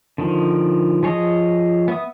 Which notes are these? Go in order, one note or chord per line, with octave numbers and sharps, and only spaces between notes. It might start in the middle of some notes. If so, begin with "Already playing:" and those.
D3 D#3 F3
F3 G#4 C#5 D#5 D#6
B3 E5 D#6